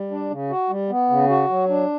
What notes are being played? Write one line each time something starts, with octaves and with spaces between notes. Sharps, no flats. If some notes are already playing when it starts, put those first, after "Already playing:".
Already playing: G3
D4
C#3
F#4
G3
B3
C#3
F#4
F#3
D4